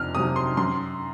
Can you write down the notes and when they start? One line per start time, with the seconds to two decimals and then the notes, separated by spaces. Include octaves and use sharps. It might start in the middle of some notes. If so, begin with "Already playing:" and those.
Already playing: F2 C3 F6
0.14 C3 F#3 D#6
0.36 C6
0.57 F#2 C6